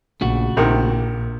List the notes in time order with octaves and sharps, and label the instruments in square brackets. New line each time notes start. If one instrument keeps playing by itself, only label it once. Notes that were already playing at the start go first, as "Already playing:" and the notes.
[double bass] A#1 [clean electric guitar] C#3 A3 F#4
[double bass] A#1 [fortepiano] A2 C3 D#3